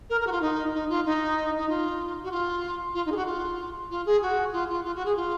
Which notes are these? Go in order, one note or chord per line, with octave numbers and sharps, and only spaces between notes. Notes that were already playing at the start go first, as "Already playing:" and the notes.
A#4
A#4
F#4
F4
D#4
D#4
F4
D#4
D#4
F4
F#4
F4
F4
D#4
G#4
F#4
F4
F4
G#4
F#4
F4
F4
F4
F#4
G#4
F4